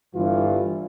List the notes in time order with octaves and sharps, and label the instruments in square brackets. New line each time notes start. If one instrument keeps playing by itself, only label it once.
[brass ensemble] G1 G2 E3 F4